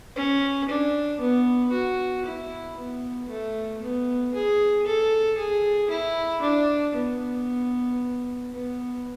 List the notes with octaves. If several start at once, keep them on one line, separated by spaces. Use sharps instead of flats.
C#4
D4
B3
F#4
E4
B3
A3
B3
G#4
A4
G#4
E4
D4
B3
B3